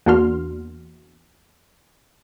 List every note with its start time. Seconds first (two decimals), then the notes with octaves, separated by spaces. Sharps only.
0.06 E2 A#3 D4 F#4 C6 F6